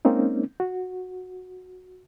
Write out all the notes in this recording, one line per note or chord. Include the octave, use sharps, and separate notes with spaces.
G#3 A#3 C4 C#4 D#4
F#4